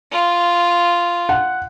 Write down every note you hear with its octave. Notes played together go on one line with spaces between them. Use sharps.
F4
F#5